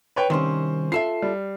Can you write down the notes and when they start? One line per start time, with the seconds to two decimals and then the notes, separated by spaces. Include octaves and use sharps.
0.16 B4 C#5 G5
0.30 C2 D#3 C4 C#4 C5
0.92 F4 A4 E5 C7
1.22 G3